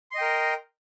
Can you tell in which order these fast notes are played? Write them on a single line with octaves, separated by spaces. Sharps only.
C6 D#5 G5 A#4